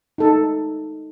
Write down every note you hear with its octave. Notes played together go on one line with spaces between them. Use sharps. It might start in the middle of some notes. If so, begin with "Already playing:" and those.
D#4 A4